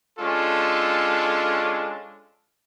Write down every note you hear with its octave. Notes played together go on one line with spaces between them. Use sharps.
G#3 C#4 D4 F4 A4